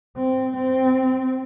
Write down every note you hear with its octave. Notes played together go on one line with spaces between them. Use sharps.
C4
C4